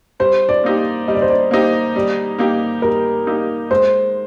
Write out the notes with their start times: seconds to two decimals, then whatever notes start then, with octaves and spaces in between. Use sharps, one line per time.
0.20 G3 C5
0.49 D5
0.64 A#3 D#4 G4
1.08 G3 D#5
1.15 D5
1.22 C5
1.30 D5
1.51 A#3 D#4 G4 C5
1.96 G3 D5
2.38 A#3 D#4 G4
2.82 G3 A#4
3.27 A#3 D#4 G4
3.71 G#3 C5